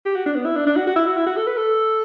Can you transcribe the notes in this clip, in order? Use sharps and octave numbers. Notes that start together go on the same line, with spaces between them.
G4
F#4
D4
B3
E4
D4
D4
F#4
F#4
E4
F#4
E4
F#4
A4
B4
A4